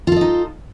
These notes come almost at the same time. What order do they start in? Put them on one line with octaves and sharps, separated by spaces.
F4 A4 D#5 D#4